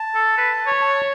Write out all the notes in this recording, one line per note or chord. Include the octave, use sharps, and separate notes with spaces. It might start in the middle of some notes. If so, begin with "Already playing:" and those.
Already playing: A5
A4
B4
C#5
A5